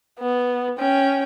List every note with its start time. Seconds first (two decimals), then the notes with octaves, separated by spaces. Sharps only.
0.19 B3
0.79 C#4 G5